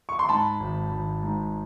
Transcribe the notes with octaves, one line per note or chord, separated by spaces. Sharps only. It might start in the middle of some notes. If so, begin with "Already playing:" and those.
C#6
C6
G#2 A5 B5
G#1
G#1
G#2